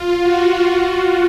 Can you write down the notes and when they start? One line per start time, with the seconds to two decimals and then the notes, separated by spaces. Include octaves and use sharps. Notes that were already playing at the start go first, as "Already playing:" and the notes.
Already playing: F4
0.20 F#4